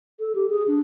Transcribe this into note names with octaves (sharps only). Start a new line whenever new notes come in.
A4
G4
G#4
D4